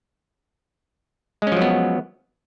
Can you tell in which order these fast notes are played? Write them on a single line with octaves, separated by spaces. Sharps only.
G#3 C#4 F3 F#3 B3